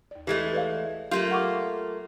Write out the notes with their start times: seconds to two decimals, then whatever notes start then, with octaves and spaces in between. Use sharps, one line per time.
0.11 D#2 D5
0.27 E3 G#3 A3 G4
0.53 B4 D5 F5
1.11 F#3 A3 A#3 F4 G4 G6
1.31 F#5 C#6 D6